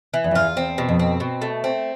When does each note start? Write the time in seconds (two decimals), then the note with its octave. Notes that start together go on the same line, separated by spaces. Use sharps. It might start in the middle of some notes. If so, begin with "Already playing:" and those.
0.14 E3
0.24 E2
0.31 F2
0.35 E2 F4
0.56 E2 C4
0.78 B2
0.89 F2
0.99 C4
1.20 B2
1.42 A3
1.64 C4